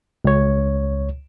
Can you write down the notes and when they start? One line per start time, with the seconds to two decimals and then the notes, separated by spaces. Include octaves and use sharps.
0.24 C#2 C#5